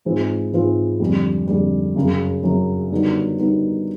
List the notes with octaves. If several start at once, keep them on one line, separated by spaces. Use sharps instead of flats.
G#2 E3 G#3 C4 F4
G#2 E3 G#3 C4 F4
F2 D3 G3
F2 D3 G3
F#2 C#3 F#3
F#2 C#3 F#3
D3 G3 B3 D#4 F#4
D3 G3 B3 D#4 F#4